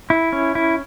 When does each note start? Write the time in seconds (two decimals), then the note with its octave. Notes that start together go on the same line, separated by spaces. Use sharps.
0.10 E4
0.33 C#4
0.55 E4